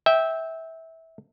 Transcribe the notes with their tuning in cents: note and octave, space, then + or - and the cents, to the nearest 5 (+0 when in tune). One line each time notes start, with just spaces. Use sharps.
E5 -20 G5 +0